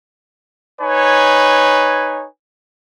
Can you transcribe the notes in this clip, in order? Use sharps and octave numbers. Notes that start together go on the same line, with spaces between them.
D#4 B4 C#5 G#5